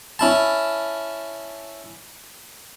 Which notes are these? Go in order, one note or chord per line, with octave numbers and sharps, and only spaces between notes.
C#4 E4 A5